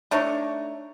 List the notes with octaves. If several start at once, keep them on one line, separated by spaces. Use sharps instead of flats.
A3 D4 D#4 C#5